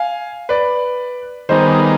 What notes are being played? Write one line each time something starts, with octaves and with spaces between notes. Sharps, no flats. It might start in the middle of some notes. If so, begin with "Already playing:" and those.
Already playing: F5 G#5
B4 D5
D#3 G3 B3 D#4 G#4 C5 D#5